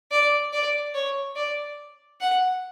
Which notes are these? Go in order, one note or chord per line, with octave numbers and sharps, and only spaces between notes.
D5
D5
C#5
D5
F#5